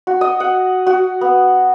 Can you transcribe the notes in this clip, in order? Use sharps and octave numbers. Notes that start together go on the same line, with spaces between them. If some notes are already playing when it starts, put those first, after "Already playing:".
F#4
D#5
F#5
F#4
B3